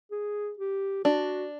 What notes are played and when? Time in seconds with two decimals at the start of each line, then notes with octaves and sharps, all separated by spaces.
0.11 G#4
0.58 G4
1.04 D4 F#4